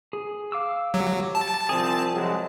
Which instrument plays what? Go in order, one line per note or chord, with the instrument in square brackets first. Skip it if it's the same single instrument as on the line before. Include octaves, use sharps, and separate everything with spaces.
[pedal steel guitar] G#4
F5 D6 E6
[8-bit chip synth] F#3 [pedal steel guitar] G4 E6
[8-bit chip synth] A5
[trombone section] C2 C4 [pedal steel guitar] F3 G#4
[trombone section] C2 F#3 G#3